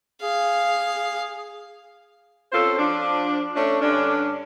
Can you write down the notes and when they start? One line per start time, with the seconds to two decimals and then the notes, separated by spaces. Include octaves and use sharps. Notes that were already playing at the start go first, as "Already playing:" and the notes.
0.22 G#4 F5
2.52 C4 C#4 F4 A4 C5
2.78 F3 D4
3.54 A3 C#4 D4
3.81 G2 D3 C#4 D4